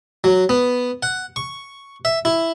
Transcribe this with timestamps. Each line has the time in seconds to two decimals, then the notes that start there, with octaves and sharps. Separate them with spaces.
0.24 F#3
0.49 B3
1.03 F#5
1.36 C#6
2.05 E5
2.25 E4